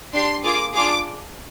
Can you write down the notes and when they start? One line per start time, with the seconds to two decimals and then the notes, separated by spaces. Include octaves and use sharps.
0.14 D4 G4 C6
0.44 A#3 F4 G#4 D6
0.73 D4 F4 G#4 D6